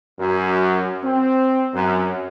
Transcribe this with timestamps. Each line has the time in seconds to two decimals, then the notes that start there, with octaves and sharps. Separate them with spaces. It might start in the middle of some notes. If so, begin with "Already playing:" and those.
0.19 F#2
1.04 C4
1.74 F#2